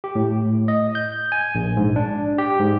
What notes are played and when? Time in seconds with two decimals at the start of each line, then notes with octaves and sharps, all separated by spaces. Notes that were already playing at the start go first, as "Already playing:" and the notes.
0.04 G4
0.15 A2
0.68 D#5
0.95 G6
1.32 G#5
1.55 A#1
1.77 G#2
1.96 D4
2.38 G4
2.59 G#2